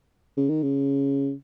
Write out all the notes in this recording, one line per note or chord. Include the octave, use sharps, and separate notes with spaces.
C#3
D#3
C#3